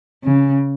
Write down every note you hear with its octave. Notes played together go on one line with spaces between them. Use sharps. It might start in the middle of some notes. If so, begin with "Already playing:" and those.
C#3